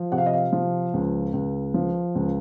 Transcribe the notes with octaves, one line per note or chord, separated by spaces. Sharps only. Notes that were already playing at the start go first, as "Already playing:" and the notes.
Already playing: F3
C3 F#5
F5
D#5
F5
F3
C#2
C#2
F3
C#2